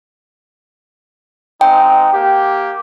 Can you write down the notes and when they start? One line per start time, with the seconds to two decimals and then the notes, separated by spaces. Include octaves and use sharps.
1.61 G#3 C4 D#4 G5
2.13 A#3 G4